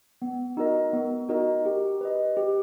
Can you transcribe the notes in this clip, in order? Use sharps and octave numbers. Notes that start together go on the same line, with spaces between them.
B3
D#4 F#4 A#4 D#5
B3
D#4 F#4 A#4 D#5
G4
B4 D#5
G4